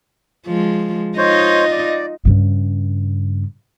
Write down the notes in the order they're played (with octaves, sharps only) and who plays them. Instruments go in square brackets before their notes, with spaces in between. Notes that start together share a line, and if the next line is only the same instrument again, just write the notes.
[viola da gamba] F3 G#3
[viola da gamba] D#4 F4 D#5 [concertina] C5 C#5
[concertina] D5
[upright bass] G2 C#3